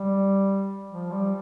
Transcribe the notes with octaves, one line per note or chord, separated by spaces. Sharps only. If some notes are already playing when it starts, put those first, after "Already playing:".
Already playing: G3
F3
G3